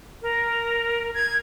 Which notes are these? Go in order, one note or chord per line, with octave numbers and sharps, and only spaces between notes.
A#4
G#6